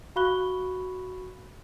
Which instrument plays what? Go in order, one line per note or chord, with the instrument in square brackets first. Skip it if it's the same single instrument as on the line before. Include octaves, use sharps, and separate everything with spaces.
[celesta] F#4 F5 B5 C#6 F#6 G7